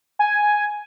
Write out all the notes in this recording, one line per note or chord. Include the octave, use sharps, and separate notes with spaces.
G#5